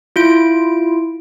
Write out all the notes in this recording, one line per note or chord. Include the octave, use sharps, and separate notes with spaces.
E4 F4 D7